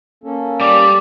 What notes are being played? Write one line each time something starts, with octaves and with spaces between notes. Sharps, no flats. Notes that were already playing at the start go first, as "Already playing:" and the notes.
A#3 C#4 A4
G3 D5 D6